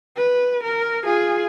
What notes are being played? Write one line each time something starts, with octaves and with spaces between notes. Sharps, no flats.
B4
A#4
F4 G#4